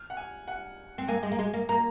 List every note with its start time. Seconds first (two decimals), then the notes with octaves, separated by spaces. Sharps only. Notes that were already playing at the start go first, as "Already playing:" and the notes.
Already playing: F6
0.10 F#5
0.17 G#5
0.48 F#5
0.98 C4
1.08 A#3 G#5
1.23 G#3
1.32 A#3
1.39 G#3
1.54 A#3
1.69 A#3 A#5